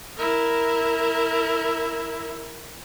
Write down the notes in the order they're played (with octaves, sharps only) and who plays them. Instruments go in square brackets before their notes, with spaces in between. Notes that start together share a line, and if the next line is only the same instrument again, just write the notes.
[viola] E4 A#4